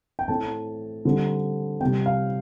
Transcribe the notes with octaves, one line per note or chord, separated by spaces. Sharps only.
G5
A2 A3 C4 A5
D3 G3 C4
C3 G3 C4 G5
F5